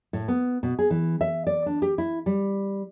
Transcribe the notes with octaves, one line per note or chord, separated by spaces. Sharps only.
A2
B3
B2
G#4
E3
E5
D5
D4
G4
E4
G3